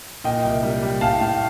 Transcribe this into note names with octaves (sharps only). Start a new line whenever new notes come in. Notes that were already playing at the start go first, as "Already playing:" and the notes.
A#2 D#5 G5
C2
G3
G3
A2 F5 A5
A2